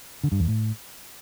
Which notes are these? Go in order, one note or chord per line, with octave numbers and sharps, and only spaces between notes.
D3
G2
E2
A2